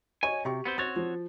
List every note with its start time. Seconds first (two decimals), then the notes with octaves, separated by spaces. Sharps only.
0.23 C#5 D#5 G#5 C#6
0.45 C3 G4 C#6
0.65 B3 C4 C5
0.78 C4 F#4 C#5 A6
0.96 F3